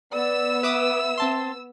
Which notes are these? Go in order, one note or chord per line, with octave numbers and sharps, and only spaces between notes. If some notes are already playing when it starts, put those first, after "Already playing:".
B3 D5 E6
B4 E5 D6 D#6
C4 A5 C6